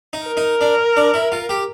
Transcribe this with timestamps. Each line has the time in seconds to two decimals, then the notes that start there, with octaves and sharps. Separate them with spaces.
0.13 D#4
0.26 A#4
0.37 D#4
0.61 D4
0.97 D4
1.14 E4
1.32 F4
1.49 G4